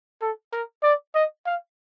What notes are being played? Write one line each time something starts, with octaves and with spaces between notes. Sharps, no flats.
A4
A#4
D5
D#5
F5